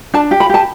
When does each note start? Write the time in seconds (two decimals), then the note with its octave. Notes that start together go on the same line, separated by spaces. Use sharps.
0.14 D4 A5
0.31 G4
0.40 B5
0.50 G4 A5